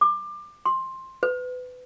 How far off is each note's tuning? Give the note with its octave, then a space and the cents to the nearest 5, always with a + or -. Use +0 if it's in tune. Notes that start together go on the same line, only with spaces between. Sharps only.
D6 +25
C6 +15
B4 +25